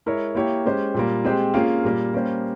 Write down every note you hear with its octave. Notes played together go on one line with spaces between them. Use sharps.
G#3 E4 A#4 C#5
A#3 E4 G4 C#5
G#3 C#4 G4 C5
A#2 G3 A#3
G#3 C4 G4 C5
A#3 C#4 F4 G#4
A#2 G3 A#3
G3 A#3 C#4 G4 C5